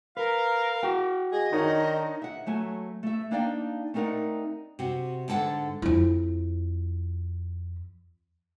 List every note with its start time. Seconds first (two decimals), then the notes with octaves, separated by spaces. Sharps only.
0.17 A#4 B4 F5
0.83 F#4 F#5 G5
1.32 G#4 D#5
1.52 D#3 D4 D#4 C#5
2.22 E5 F#5
2.47 F#3 A3 G#5
3.03 A3 E5
3.31 A#3 D4 D#4 D5 F5 G5
3.94 A3 C4 D#4 A#4 D5 F#5
4.79 C3 F#4
5.28 G#2 D3 A4 B4 F#5
5.82 F2 E4